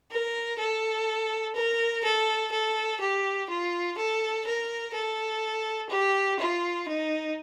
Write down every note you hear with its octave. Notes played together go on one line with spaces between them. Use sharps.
A#4
A4
A#4
A4
A4
G4
F4
A4
A#4
A4
G4
F4
D#4